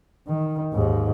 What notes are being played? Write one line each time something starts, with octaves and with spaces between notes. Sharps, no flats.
D#3
D#2 G#2